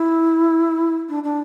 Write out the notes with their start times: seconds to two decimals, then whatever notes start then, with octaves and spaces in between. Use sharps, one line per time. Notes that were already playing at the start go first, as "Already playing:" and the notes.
Already playing: E4
1.09 D4
1.23 D4